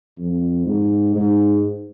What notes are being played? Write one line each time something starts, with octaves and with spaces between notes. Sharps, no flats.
F2
G#2
G#2